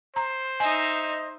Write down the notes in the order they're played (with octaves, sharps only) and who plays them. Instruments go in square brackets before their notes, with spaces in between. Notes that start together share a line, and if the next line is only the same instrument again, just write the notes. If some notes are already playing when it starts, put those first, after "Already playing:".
[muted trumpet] C5 [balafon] A#5
[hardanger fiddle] D#4 E5 [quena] D#5 [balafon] G#5